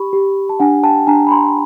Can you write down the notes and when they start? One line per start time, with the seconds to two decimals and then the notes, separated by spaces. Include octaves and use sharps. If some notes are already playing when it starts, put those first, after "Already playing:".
Already playing: G4 B5 C#6
0.13 G4
0.49 A5
0.59 D4 F#5 G#5
0.83 G5 A5
1.07 D4 G#5 A#5
1.27 B5
1.32 A#5 C6